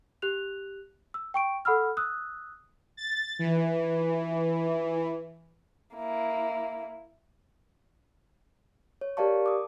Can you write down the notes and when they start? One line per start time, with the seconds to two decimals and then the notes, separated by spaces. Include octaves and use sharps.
0.22 G4 F#6 F7
1.14 E6
1.34 G5 C#6 D7
1.65 A4 F#5 B5 E6 F6
1.97 D#6 E6 F#6
2.97 A6
3.39 E3
5.95 A#3 E4
9.01 C#5
9.17 G4 A#4 D5 F5 A5 C#6
9.46 D6 D#6